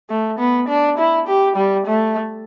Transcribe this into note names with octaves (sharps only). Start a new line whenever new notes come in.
A3
B3
D4
E4
G4
G3
A3